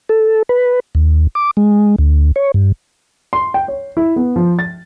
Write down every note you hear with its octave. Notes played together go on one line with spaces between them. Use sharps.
A4
B4
D#2
D6
G#3
D2
C#5
G2
C6
G5
C#5
E4
B3
F3
A6